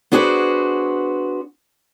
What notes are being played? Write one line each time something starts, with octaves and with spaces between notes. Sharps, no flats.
B3 D4 F#4 G#4 B4 C5